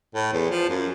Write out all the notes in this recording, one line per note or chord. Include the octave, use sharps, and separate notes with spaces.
A2
E2
F3
F#2